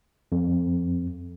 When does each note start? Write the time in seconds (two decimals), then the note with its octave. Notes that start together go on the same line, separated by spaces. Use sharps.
0.32 F2